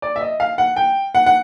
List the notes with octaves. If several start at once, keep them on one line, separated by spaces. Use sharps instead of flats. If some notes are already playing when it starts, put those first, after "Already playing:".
D5
E5
D#5
F5
F#5
G5
F#5
F#5